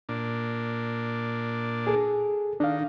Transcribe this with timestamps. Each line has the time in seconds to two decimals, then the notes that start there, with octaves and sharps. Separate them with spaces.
0.09 A#2 D4
1.87 G#4 A4
2.60 D#3 D4 F5